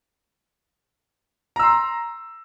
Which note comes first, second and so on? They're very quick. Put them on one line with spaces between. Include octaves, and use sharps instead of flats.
A#5 E6 C6